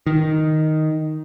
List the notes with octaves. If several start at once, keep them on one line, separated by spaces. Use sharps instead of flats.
D#3